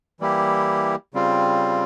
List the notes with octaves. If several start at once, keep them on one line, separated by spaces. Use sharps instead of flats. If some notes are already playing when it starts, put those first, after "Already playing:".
E3 G3 A#3 E4 G4
C#3 G3 C4 F4